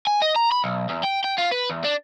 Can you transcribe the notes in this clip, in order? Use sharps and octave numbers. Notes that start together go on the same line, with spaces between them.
G#5
D#5
A#5
B5
B1
E2
G5
G5
F4
B4
E2
D4